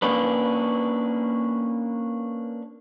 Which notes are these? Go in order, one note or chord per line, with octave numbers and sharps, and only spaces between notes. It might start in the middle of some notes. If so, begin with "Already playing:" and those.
A#3 C#4 D4 B4